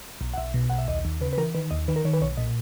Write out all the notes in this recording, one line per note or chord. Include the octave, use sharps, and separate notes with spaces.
B1
F#5
B1 E5
B2
B1 F#5
E5
D#2 D#5
D#2
C#3 B4
B4
E3 A#4
D#3 B4
D#2 D#5
D#3 B4
A#4
D#3 C#5
B4
B1 C#5
A#2 D#5